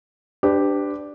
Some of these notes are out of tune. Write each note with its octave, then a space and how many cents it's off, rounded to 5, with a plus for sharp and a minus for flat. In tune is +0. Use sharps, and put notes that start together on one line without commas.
D4 +0 G4 +0 B4 +40